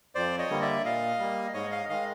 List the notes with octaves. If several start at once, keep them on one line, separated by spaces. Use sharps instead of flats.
F2 C5 D5
C#5 D#5
D3 G3 A#3
D5 E5
A#2 D#5 F5
G3 A#3
G#2 C#5 D#5
D#5 F5
D#3 G#3 D#5 F5